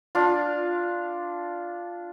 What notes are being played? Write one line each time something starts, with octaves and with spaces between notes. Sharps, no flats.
D4 F4